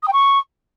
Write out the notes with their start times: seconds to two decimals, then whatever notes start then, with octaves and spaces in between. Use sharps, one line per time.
0.03 D#6
0.08 G5
0.13 C#6